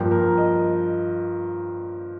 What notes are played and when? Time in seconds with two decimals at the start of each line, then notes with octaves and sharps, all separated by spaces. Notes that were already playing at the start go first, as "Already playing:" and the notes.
Already playing: G2 F3 A#3 G5
0.11 A#4
0.38 D#5